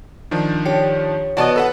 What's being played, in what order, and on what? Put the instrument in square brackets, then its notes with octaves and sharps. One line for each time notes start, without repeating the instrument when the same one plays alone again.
[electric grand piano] D#3 F3 D4
[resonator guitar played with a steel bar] G4 [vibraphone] C#5
[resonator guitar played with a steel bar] E3 B3 D#5 [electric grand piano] F#4 D5 A5
[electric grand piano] A4 B4 F#5